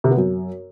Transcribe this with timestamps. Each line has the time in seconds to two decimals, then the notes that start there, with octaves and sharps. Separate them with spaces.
0.04 C3
0.11 B3
0.17 F#2